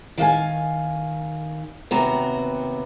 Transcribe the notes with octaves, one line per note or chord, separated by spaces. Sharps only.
D#3 F5 F#5 G#5
D#2 C3 B3 F#4 A#5